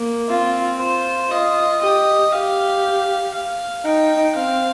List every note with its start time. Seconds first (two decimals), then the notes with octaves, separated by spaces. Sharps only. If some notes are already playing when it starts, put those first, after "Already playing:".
Already playing: A#3
0.29 C4 F4
0.79 F4 C5
1.30 F4 D#5
1.81 G4 D#5
2.32 G4 F5
3.34 F5
3.84 D#4 G5
4.35 C4 F5